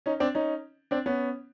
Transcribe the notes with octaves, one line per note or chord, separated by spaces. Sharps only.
C#4 D#4
C4 D4
C#4 D#4
C4 D4
B3 C#4